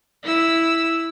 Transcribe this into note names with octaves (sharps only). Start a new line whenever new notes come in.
E4 E6